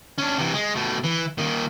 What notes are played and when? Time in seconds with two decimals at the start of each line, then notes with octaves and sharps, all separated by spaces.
0.18 C#4 D4
0.38 C3 E3
0.54 G#3
0.75 B2 A3
1.04 E3
1.38 A#2 D#3